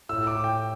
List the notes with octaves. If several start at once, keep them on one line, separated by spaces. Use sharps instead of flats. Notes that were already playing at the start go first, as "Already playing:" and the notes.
A2 E6
D6
A2
G5